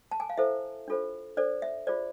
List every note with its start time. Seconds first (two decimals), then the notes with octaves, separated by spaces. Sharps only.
0.11 A5
0.20 G#5
0.29 F5
0.38 E4 A4 C5 E5
0.88 D4 F4 A4 C5
1.37 D4 A4 C5 D5
1.62 E5
1.87 F4 G#4 C5 D5